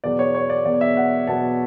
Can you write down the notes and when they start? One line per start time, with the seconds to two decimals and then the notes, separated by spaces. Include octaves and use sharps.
0.04 E2 B2 F#3 B3 D5
0.19 C#5
0.35 C#5
0.50 D5
0.65 E2 B2 F#3 B3 D5
0.81 E5
0.97 F#5
1.27 E2 B2 F#3 B3 A5